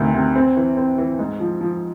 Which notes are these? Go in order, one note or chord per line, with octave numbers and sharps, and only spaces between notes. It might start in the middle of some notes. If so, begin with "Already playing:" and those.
Already playing: D2 C3 D#3
C3
C4
E3
C4
E3
G#2
F3
F3